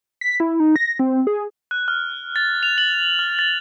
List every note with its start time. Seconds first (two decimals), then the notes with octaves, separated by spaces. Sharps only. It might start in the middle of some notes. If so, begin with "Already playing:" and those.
0.21 B6
0.40 E4
0.60 D#4
0.76 A#6
0.99 C4
1.27 G#4
1.71 F#6
1.88 F6
2.36 A6
2.63 F7
2.78 F#7
3.19 F6
3.39 A6